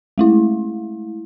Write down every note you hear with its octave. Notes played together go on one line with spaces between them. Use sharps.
G#3 A3 E4